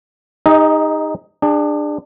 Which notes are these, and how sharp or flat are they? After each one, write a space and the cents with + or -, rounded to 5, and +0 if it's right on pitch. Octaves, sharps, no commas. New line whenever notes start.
D#4 +0 G#4 -45 D#5 +30
D4 +20 G#4 -30